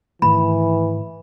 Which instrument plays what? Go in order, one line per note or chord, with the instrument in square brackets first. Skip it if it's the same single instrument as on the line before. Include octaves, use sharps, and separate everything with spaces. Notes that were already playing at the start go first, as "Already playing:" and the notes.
[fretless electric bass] G#2 D#3 A3 [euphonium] E3 [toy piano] B5